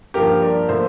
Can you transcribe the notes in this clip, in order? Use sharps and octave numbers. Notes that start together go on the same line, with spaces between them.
G2 F3 A#3 G4 A#4
A#4 D5
A2 F3 A#3 C5 E5